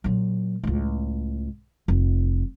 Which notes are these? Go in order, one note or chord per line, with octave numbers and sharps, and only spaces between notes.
A#2 F#3
C#2 A2
F1